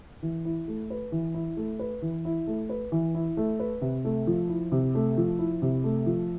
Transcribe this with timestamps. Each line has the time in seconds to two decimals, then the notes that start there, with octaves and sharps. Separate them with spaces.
0.22 E3
0.45 E4
0.68 A3
0.90 B4
1.12 E3
1.34 E4
1.57 A3
1.79 B4
2.02 E3
2.25 E4
2.47 A3
2.69 B4
2.92 E3
3.15 E4
3.37 A3
3.60 B4
3.82 C3
4.05 A3
4.27 F3
4.49 E4
4.72 C3
4.95 A3
5.17 F3
5.39 E4
5.62 C3
5.84 A3
6.06 F3